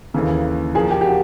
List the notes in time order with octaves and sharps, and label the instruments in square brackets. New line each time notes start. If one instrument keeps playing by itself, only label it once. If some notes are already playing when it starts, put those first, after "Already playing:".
[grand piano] D#2 C#3 E3 [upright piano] A4
[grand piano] A#2 F3 A#3 [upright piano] G#4
[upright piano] G4
G4
F#4